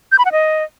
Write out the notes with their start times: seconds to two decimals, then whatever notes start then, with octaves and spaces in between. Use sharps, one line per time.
0.12 G6
0.19 B5
0.25 F#5
0.32 D#5